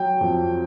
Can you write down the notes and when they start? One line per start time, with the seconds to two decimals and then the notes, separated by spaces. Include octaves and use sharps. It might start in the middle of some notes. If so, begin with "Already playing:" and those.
Already playing: F#3 G5
0.21 F2